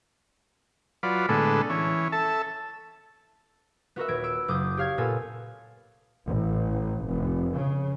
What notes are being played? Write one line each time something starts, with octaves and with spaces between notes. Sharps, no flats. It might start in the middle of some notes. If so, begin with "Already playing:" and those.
F#3 F4 B4 D5
A2 D3 G#3 B3 A4
E3 C#4
A4 E5 A5
B3 F#4 A#4 E5
D#1 B4 G#6 D7
E6 D7 E7
F#1 D6 D#6 G6
G4 C#5 F5 F6 G#6
A#2 B3 F4 A4 G#5
A1
F1
C#3